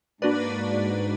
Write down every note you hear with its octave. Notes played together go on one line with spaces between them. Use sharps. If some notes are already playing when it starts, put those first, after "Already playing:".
G#2 A#3 D4 F#4 B4 D5